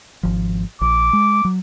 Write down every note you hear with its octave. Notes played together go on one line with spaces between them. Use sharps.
G#1 F3
A#1 D6
G#3
F#3